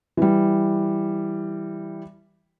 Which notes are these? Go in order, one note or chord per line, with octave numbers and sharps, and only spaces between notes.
E3 G3